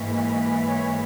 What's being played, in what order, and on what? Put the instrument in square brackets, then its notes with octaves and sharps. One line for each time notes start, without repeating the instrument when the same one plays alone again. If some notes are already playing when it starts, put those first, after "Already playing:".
Already playing: [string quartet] G#2 E3 A#3
C#5